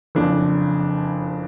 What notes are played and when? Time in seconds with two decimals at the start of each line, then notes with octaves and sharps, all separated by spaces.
0.15 F#1 F2 C#3 D4